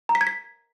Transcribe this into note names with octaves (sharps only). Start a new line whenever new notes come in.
A#5
B6
G#6
B6